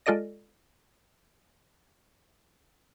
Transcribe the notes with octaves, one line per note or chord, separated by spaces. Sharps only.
G#3 F4 A4 D5 D#5 A#6